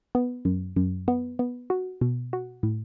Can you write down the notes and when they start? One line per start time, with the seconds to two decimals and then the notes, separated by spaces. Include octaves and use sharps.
0.15 B3
0.45 F#2
0.76 F#2
1.08 B3
1.39 B3
1.70 F#4
2.01 B2
2.33 F#4
2.63 A2